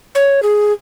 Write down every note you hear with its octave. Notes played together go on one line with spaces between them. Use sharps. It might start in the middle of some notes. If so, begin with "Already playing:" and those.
C#5
G#4